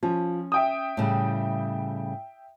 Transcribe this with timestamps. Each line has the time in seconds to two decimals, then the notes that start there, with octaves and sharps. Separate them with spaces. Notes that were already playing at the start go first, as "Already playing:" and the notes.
0.03 F3 C#4
0.52 E5 G5 D#6
0.97 A2 C#3 G3